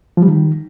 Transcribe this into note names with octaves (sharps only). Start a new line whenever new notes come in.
F3
G3
D#3